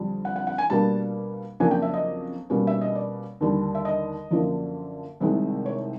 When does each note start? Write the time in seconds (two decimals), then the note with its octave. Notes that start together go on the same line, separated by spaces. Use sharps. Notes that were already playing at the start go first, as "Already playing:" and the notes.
Already playing: F2 D3 G3
0.25 F#5
0.36 F#5
0.47 F#5
0.58 G#5
0.70 B2 G3 A#3 D4 A5
1.60 F2 C#3 F#3 A#3 D4 G#5
1.71 G5
1.82 E5
1.94 D#5
2.50 B2 G3 A#3 C#4
2.67 E5
2.81 D#5
2.95 D5
3.41 D#2 D3 G3
3.75 E5
3.85 D#5
4.31 F#2 D3 F3 A#3
5.20 C2 C3 D#3 G#3
5.66 C#5